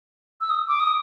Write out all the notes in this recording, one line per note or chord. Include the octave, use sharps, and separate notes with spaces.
E6
D#6
D6
D#6